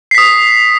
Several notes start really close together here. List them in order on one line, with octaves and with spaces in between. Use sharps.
C7 B6 D#6